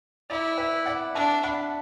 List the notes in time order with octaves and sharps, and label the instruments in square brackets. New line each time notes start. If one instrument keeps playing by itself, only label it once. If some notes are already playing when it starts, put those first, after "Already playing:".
[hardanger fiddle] E4 [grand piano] D5
[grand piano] B4 E5
D5 F#5
[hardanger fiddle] D4 [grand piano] E5 A5
[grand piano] F#5 B5